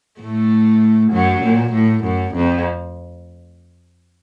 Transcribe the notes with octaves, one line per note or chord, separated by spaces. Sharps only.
A2 A3
F#2 F#3
A#2
A2
F#2
F2